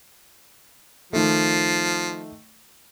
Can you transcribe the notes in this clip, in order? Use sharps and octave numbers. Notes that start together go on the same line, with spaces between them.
D#3 F3 A3